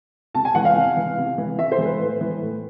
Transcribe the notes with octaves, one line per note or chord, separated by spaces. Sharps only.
C3 A5
G#5
E3 F#5
F5
C3
E3
C3
E3
C3 E5
C5
E3
B4
A2
E3
A2